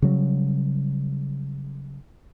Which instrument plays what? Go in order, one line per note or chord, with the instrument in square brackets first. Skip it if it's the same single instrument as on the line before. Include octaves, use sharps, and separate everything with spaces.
[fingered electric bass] C#3 F#3 G3